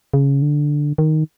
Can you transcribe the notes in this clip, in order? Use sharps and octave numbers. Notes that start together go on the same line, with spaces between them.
C#3
D3
D#3